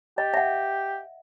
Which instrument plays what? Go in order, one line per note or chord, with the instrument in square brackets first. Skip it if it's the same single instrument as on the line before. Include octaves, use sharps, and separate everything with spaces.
[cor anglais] G4 [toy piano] D#5
[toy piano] E5 F#5